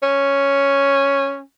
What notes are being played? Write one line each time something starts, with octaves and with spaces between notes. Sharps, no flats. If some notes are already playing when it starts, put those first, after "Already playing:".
C#4